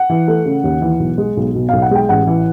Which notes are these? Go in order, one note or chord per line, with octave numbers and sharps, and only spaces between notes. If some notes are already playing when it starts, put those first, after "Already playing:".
Already playing: F#5
E3
A3
C#3
D#2
E3
B1
G#3
B1
B2
B1 F5
F#5
G#3 G5
A1 F#5
E3